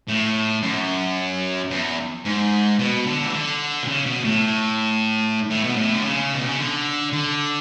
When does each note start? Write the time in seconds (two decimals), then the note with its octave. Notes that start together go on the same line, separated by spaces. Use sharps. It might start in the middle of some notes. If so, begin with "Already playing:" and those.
0.08 A2
0.63 F#2
1.71 E2
2.25 G#2
2.79 B2
3.07 D3
3.23 E3
3.34 D3
3.83 B2
3.88 C#3
4.05 B2
4.24 A2
5.50 A2
5.64 B2
5.76 A2
5.94 D3
6.04 C#3
6.34 B2
6.47 C#3
6.59 D3
7.12 D3